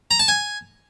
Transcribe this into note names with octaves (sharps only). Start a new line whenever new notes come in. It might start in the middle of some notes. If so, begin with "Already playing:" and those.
A#5
A5
G#5